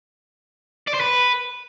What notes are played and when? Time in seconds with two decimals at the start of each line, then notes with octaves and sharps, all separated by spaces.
0.88 D5
0.94 C5
1.01 B4